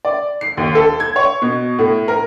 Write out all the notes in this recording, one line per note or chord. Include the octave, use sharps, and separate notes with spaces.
D5
C7
D#2
A4
G#6
C#5
B2
A2
A#4